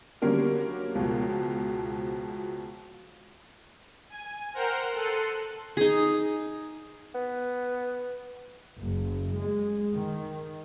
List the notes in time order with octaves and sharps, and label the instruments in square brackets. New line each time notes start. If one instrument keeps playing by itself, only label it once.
[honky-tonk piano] D3 F#3 G3 A#3 C#4 A#4
C#2 B2 F3
[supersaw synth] G#5
A#4 C5 F#5 G5 A#5 F6
A4 C6 F#6 C#7 D#7
[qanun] D#4 G#4
[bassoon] B3
[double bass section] F#1
G#3
D#3